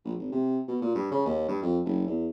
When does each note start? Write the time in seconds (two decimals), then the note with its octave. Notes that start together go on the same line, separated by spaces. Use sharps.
0.05 A#1
0.19 G#1
0.32 C3
0.68 B2
0.81 A#2
0.95 G2
1.12 C#3
1.26 D#2
1.48 G2
1.62 F2
1.85 F#1
2.07 E2